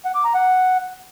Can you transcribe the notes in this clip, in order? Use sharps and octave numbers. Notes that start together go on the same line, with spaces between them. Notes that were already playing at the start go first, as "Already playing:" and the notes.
F#5
D6
A#5
F#5